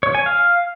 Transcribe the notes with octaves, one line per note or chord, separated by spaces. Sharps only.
C#5
G#5
F5